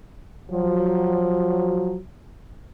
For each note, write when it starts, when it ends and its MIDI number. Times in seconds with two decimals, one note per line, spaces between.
0.51 1.98 53
0.51 1.98 54